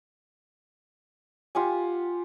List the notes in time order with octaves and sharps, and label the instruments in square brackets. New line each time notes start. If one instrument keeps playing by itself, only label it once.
[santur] F4 G4 F#5 G#5